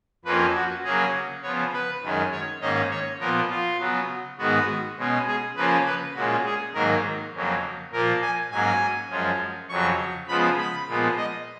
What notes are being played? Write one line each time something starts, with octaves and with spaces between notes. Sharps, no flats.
F2 F3 A#3 C#4 B4
F#4
C#3 F#3 A#3 C#4 G#4
C#3 F3 B3 C#5
B4
F#2 D#3 G#3 C#4
C#5
G#2 D#3 A#3 C#4 D#5
C#5
A#2 F3 B3 A#4
F4
C#3 F#3 B3
G#2 D#3 G#3 B3 F#4
B2 G#3 C#4
G#4
C#3 F3 A#3 C#4 B4
B4
A#2 G#3 C#4 F#4
G#4
G#2 D#3 F#3 A#3 A#4
F2 C#3 F#3 A#3
A#2 F3 A#3 A#4
G#5
G#2 F#3 A#3 C#4 G#5
F#2 F3 G#3 C#4
F2 C#3 F#3 C#6
C#3 F3 G#3 B3 B5
B5
A#2 F3 G#3 B3
D#5